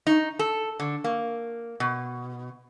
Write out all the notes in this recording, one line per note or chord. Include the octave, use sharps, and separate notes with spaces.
D#4
A4
D3
A#3
B2